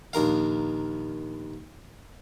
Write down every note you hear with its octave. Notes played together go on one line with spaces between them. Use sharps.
A#1 D#2 A#4 F5